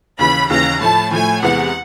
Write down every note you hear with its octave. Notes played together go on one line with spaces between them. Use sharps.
D#2 C#3 E3 B5
D#2 C#3 E3 A#5
A2 F3 A3 A5
A2 F3 A3 G#5
E2 C3 E3 G#3 B3 F#5